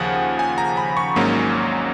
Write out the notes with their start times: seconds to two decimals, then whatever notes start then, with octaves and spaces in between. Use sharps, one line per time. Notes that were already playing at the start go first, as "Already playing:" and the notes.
Already playing: D#2 C#3 F3 F#5 G#5
0.39 G#5
0.58 A#5
0.77 B5
0.97 C#6
1.16 G#1 G#2 F#3 A#3 C#4